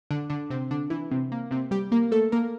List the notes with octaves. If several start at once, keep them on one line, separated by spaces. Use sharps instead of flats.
D3 D4
D3 D4
C3 C4
D3 D4
E3 E4
C3 C4
A#3
C3 C4
G3 G4
A#3 A#4
A3 A4
A#3 A#4